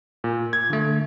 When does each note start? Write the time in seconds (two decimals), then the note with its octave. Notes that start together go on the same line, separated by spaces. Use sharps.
0.24 A#2
0.53 G#6
0.70 D3 A3